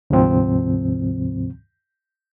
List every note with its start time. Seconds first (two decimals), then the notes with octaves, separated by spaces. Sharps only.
0.10 D2 G#2 C3 F3 C4